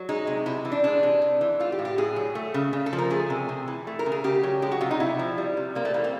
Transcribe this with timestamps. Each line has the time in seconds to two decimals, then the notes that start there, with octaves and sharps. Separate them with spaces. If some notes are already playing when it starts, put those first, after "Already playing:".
Already playing: F#3
0.09 G#3 D#4
0.27 C3
0.46 C3 E4
0.65 E3
0.72 D4
0.84 G#3 D4
1.03 C3
1.22 C3
1.41 E3
1.59 A3 F4
1.72 G4
1.79 A2
1.85 G4
1.98 A2 G#4
2.16 F#3
2.35 A3
2.54 C#3
2.73 C#3
2.86 A4
2.93 F3
2.98 A#4
3.10 A3 G#4
3.30 C3
3.49 C3
3.68 E3
3.87 A3
3.99 A#4
4.06 C#3
4.12 G#4
4.24 C#3 G4
4.43 F#3
4.62 G#3 G4
4.72 F#4
4.81 C3 F4
4.91 D#4
5.00 C3 E4
5.19 F3
5.38 G3
5.57 C3
5.75 C3 A#3
5.85 A3
5.94 E3 A#3
6.04 C4